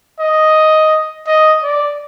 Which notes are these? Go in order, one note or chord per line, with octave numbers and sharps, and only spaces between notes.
D#5
D#5
D5